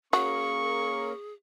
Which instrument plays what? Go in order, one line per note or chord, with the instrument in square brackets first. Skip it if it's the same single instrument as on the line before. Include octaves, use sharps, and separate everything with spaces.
[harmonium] A#3 C#4 A#4 [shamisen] F#4 [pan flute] G#4 [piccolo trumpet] C#6